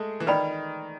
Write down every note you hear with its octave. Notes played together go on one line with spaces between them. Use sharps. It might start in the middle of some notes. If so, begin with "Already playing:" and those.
Already playing: G#3 A3
E3
D#3 B4 D5 G5 B5